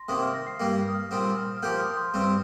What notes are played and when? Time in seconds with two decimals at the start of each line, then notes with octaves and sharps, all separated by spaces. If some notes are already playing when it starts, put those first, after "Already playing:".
Already playing: C6 A#6
0.08 C3 D#3 A#3 D#6
0.22 F6
0.34 A#6
0.47 C7
0.60 G2 G3 A#3 A#6
0.88 D#6
0.94 F6
1.11 A#2 G3 C4 D#6
1.36 F6
1.57 F6
1.63 F3 A#3 G4 G6
1.73 F6
1.79 D#6
1.90 D#6
1.97 C6
2.14 G2 G3 C4